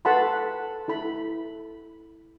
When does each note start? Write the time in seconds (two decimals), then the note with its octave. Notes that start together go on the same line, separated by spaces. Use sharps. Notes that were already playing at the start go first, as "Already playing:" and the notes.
0.05 A4 B4 F#5 A5 B5 C6
0.88 E4 A4 B5